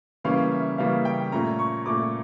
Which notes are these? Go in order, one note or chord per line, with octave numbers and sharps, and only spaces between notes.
C#3 E3 G3 A#3 C#4 F5
E5
C#3 E3 G3 A#3 C#4 F5
G5
A#2 A3 C#4 A#5
C#6
A#2 A3 C#4 D6